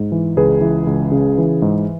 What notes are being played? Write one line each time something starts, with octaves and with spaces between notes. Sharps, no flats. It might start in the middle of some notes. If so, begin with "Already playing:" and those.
Already playing: G#2
E3
C#2 G#4 B4
E3
C#2
C#3
E3
G#2